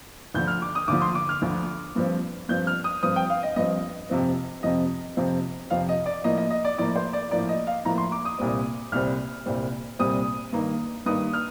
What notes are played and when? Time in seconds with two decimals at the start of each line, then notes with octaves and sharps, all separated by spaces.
0.34 D2 D3 F3 G6
0.48 F6
0.62 D6
0.75 D#6
0.88 D2 D3 F3 D6
1.02 C6
1.15 D6
1.29 F6
1.42 D2 D3 F3
1.96 G2 F3 C4
2.49 G2 F3 C4 G6
2.67 F6
2.84 D#6
3.03 G2 F3 C4 D#6
3.16 G5
3.30 F5
3.43 D#5
3.56 G2 F3 C4 D#5
4.10 F2 C3 F3 C4
4.63 F2 C3 F3 C4 D#5
5.17 F2 C3 F3 C4
5.70 F2 C3 F3 C4 F5
5.89 D#5
6.06 D5
6.24 A2 F3 A#3 D#5
6.38 D#5
6.50 D#5
6.65 D5
6.78 A2 F3 A#3 D5
6.96 C5
7.13 D5
7.31 A2 F3 A#3 D5
7.49 D#5
7.67 F5
7.85 A2 F3 A#3 A#5
7.98 C6
8.12 D6
8.25 D#6
8.38 C2 A#2 G3 C4
8.92 C2 A#2 G3 C4 F6
9.46 C2 A#2 G3 C4
9.99 C2 A#2 G3 C4 D#6
10.52 G2 D#3 A#3
11.06 G2 D#3 A#3 D#6
11.34 F6